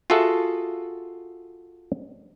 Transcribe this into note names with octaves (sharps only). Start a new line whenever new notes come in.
F4 F#4 G#4 A4 E5 F#5